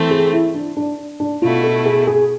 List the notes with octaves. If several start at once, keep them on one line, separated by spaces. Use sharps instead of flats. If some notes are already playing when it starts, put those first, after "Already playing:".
Already playing: E3 A3 C4
G#4
E4
D4
D4
D4
B2 A3 E4 F4
A4
G#4
G#4